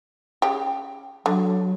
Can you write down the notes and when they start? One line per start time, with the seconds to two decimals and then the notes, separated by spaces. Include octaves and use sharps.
0.42 C#3 G4
1.26 D3 F#3